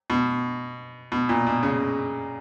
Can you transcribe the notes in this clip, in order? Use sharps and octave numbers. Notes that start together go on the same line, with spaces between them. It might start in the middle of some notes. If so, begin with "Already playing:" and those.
B2
B2
A#2
B2
C#3